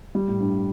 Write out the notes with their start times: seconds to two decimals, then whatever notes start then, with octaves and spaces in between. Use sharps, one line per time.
0.15 G3
0.28 A2
0.40 G2